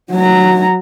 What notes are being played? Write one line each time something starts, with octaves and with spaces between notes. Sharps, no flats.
F#3 A#5